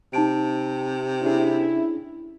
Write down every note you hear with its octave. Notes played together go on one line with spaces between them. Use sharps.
C3 D#4 A5 D7
C#4 D4 E4 G#4